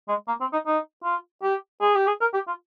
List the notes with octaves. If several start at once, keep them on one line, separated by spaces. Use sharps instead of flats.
G#3
A#3
C4
D#4
D#4
F4
G4
G#4
G4
G#4
A#4
G4
F4